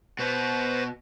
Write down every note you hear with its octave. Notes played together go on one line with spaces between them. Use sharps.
B2 B3 B4 C5